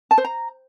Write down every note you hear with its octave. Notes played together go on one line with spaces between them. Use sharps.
A5
C5
A#5